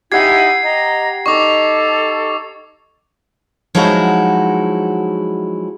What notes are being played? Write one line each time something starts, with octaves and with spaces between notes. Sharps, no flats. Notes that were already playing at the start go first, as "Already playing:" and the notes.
D#4 E4 G4 F#5 G#5 G#6 C7
D#5 A#5
D#4 A4 D#5 C#6 D6
F3 F#3 G#3 D#4 E4 F#4